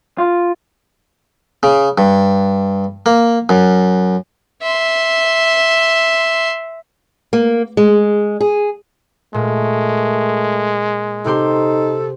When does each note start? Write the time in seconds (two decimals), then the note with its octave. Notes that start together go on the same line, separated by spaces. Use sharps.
0.18 F4
1.63 C#3
1.98 G2
3.06 A#3
3.49 F#2
4.62 E5 C6
7.33 A#3
7.77 G#3
8.40 G#4
9.34 A#2 G#3 A3
11.26 C3 D#4 G4 A4 C6